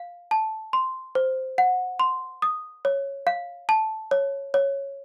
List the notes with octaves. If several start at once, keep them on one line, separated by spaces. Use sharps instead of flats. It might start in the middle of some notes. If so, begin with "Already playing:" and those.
Already playing: F5
A5
C6
C5
F#5
C6
D#6
C#5
F5
A5
C#5
C#5